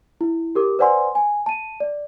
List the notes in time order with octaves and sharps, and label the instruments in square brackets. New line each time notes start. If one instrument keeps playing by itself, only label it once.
[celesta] E4
G4 A#4 D6
B4 C5 D5 F#5 G#5 C6
G#5
A5 D#7
D5